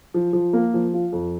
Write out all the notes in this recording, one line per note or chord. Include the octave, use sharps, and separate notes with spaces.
F3
F3
A#3
F3
F4
F2